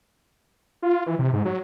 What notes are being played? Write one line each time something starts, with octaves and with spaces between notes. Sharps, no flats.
F4
E3
C3
G#2
F#3